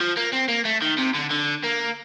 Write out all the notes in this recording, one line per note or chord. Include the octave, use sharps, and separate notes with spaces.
F3
A#3
C4
A#3
A3
D#3
C3
D3
D3
A#3